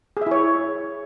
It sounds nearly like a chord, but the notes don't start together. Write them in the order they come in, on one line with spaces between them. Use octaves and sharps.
G#4 E5 E4 C#5